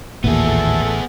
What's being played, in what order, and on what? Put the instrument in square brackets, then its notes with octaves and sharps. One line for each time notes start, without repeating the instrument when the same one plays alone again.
[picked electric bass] A1 [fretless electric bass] D#2 A#2 [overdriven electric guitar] B3 G#4 [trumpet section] A4 E5